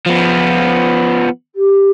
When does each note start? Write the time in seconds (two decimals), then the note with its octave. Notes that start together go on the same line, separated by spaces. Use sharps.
0.07 F3 B3
1.55 G4